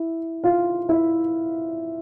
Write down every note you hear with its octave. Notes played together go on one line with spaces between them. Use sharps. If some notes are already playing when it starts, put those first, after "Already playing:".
Already playing: E4
F4 F5
E4 E5